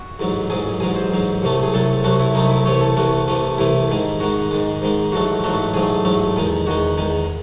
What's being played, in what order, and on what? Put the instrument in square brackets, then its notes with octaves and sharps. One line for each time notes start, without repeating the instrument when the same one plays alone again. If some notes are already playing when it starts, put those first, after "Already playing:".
Already playing: [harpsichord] F#4
A1 G#2 F#3
A1 G#2 F#3 G#4
A1 G#2 F#3 G#4
C5
A1 G#2 F#3
C2 C3 F#3 A3
G#4
C2 C3 F#3 A3 A4
C2 C3 F#3 A3 F#4
E4
C2 C3 F#3 A3 D#4
E4
C2 C3 E3 A3 C#5
A4
C2 C3 E3 A3 F#4
C2 C3 E3 A3
C2 C3 E3 A3 E4
G#2 D#3 G#3
G#2 D#3 G#3 F#4
G#2 D#3 G#3
G#2 D#3 G#3
A1 G#2 F#3 A3 F#4
A1 G#2 F#3 A3 F#4
A1 G#2 F#3 A3 G#4
A1 G#2 F#3 A3
E2 D#3 G#3
E2 D#3 G#3 F#4
E2 D#3 G#3